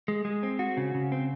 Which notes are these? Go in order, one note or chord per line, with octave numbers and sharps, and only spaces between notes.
G#3
G#3
C4
F#4
C#3
C#3
C4